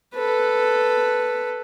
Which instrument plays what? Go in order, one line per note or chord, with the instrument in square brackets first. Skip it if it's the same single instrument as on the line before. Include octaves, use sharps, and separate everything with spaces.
[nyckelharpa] A4 B4